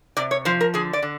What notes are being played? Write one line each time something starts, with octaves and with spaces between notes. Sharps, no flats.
C3 D5
C#5
F3 C5
A#4
D3 G#4
D5
D3